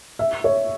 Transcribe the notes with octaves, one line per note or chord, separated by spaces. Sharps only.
E5
C#5